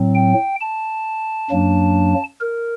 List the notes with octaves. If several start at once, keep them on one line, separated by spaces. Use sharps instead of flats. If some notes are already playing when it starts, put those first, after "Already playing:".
Already playing: A2 F#3 C4
G5
A5
F#2 F#3 A#3 D4
A#4